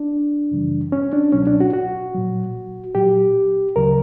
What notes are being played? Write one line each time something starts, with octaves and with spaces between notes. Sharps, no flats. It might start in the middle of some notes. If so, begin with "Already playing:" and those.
Already playing: D4
F#2 C#3 E3 G3
C#4
D4
C#2 B2 F#3 C#4
D4
F#4
F#4
A#2 F#3
A#2 F#3 G4
D2 C#3 F#3 A#4